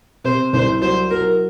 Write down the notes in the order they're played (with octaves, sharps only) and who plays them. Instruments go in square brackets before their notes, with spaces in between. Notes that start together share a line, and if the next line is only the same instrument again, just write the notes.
[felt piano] C3 [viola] C5
[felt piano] C2 [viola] C5
[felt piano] F#3 [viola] C5
[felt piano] F#3 [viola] A#4